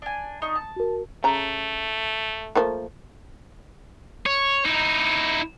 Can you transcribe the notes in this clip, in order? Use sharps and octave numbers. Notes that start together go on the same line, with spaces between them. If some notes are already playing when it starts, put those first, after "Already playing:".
D4 G#5
D4 D#4 C#6
A5
F#4 A#4
C#3 A3 A#5
F3 A3 A#3
C#5
D#4 E4